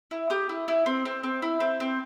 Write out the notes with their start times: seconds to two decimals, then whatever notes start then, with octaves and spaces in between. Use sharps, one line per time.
0.11 E4
0.30 G4 D#6
0.49 E4
0.68 E4
0.86 C4
1.05 C4
1.23 C4
1.42 E4
1.60 C4
1.80 C4